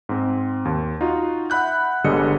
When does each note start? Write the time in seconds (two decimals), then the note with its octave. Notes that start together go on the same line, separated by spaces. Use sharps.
0.09 G#2 C4
0.65 D#2
1.01 D#4 F4 F#4
1.50 E5 F#5 B5 F#6 G6
2.04 G1 D3 G3 G#3 D#5 C#7